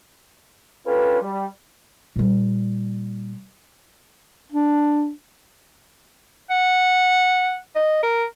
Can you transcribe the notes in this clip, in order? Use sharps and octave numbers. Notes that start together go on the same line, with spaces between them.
C#4 D4 F4 G4 A4 B4
G3
A#2 G3
D4
F#5
D#5
A#4